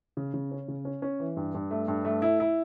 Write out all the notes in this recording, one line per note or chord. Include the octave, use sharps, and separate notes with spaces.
C#3
C#3
C#4
C#3
C#4
C#4
E3
G2
G2
A3
G2
A3
E4
E4